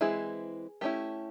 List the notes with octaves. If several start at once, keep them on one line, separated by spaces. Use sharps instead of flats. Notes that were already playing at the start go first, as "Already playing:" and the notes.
E3 G#3 C4 E4 G#4
A3 C#4 E4 G4